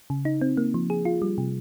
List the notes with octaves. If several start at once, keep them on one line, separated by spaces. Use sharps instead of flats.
C#3
D#4
C4
A#3
F3
G#4
F4
G3
C3